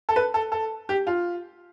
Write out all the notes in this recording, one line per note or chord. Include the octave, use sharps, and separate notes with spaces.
A4
B4
A4
A4
G4
F4